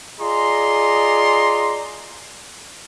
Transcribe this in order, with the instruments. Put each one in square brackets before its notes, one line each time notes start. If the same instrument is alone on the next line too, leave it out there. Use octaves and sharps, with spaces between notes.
[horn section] F4 G#4 D5 D#5 A#5 C6